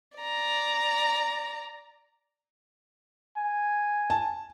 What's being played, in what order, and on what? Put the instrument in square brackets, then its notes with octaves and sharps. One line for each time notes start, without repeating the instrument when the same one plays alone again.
[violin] D5 A#5
[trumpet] G#5
[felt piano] A5